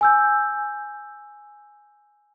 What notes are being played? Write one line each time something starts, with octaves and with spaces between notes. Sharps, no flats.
G#5 E6 G6